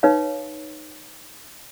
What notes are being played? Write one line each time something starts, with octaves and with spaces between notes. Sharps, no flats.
D#4 B4 C#5 F5